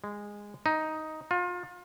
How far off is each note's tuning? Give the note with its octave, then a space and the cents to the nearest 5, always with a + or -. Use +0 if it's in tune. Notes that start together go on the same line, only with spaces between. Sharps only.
G#3 -15
D#4 +5
F4 +30